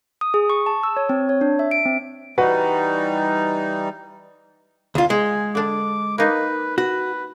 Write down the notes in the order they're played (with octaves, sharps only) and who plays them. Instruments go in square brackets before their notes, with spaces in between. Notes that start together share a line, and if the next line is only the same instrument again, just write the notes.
[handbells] D#6
G#4
C#6
A5
E6
C#5
C4
C#5
D4
E5
D7
C4
[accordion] E3 G3 D#4 [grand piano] F#4 B4 F#5
[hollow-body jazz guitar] D2 F4
[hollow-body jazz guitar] G#3 [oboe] G#5
[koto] D3 D4 [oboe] D6
[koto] A#3 D#4 [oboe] B4
[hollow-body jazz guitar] F#4 [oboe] B4